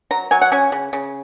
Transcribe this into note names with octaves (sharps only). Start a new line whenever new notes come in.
F#3 A#5
F#3 G#5
F#5
C#4 G#5
C#3
C#3